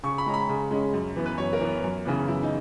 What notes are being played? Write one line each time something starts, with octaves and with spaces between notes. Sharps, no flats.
C#3 C#6
B5
G#3 C#4 A#5
B5
C#3
G#3 C#4
F#2
E3 B3
B4
F#2 C#5
A#4
E3 B3
F#2
C#3 E3 B3
F#2 E4
D#4